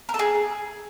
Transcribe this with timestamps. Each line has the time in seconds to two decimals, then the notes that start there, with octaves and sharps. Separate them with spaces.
0.09 A#4
0.14 A4
0.19 G#4